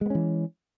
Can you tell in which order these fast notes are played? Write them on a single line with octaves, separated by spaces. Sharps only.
G#3 B3 C#4 E3